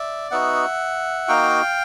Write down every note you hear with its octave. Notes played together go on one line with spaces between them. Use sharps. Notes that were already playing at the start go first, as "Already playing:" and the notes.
Already playing: D5 E5
B3 D#4 F#4 E5 F#5
A#3 D#4 F#4 F5 G5